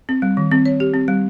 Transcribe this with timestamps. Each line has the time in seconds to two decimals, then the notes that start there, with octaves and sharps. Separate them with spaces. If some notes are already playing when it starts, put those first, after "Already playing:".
0.09 C4
0.22 G3
0.37 D#3
0.51 C4
0.66 C#5
0.80 G4
0.94 C4
1.08 G3